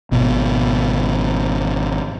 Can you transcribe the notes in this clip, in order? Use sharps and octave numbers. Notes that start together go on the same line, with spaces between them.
G#1 B2